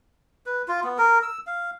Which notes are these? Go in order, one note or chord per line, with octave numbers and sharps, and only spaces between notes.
B4
F4
B3
A#4
E6
F5